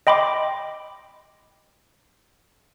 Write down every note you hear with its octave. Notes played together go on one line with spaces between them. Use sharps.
D#5 G5 B5 C6 D6